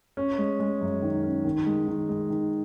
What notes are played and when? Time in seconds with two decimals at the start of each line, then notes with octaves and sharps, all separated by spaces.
0.17 C#4
0.38 G#3
0.60 G#3
0.81 F#2
1.02 D#3
1.23 C#4
1.45 D#3
1.66 G#3
1.87 D#3
2.09 G#3
2.30 D#3